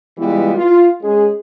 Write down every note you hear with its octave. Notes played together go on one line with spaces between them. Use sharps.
E3 G3 G#3 B3 F4
F4
G#3 C#4 G#4